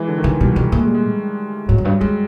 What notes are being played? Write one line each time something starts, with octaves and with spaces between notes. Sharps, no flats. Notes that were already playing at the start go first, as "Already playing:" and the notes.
Already playing: E3 G#3
D3
D#3
C#3 E3
B2 G3
B2 G3
A#2 A3
G#3
G3
G#3
A2 F#3
F#2
G2 G3
F#2 G#3